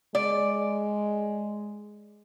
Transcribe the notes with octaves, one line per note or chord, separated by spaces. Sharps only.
G#3 D5